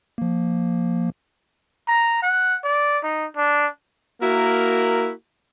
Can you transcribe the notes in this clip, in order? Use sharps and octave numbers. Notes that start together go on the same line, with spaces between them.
F3 A#3
A#5
F#5
D5
D#4
D4
A#3 E4 F#4 A#4